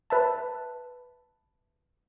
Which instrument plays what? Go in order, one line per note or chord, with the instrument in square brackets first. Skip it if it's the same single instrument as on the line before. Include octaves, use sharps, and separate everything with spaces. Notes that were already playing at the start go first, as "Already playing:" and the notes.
[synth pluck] B4 E5 A5